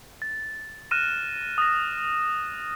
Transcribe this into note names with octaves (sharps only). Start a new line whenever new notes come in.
A6
F6 F#6 A#6 D#7 E7
D#6 A#6